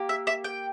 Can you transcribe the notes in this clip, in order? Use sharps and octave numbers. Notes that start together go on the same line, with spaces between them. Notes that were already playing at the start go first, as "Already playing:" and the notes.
Already playing: A#3 G4
E5
E5
G5